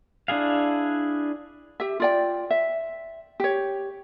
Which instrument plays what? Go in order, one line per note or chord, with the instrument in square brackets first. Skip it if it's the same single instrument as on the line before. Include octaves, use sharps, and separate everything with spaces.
[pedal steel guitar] D4 E4 G#4 F5
[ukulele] G4 E5
F4 D5 G5
E5
G4 C#5